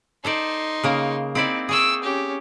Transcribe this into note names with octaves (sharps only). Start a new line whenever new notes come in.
D#4 A4 C5 D5 C6
C#3 A#3 A#4
C4 D#4 E4 D5
G#4 D5 G5 C#6 E6
C#4 G4